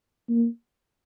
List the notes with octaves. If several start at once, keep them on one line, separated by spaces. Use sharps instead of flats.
A#3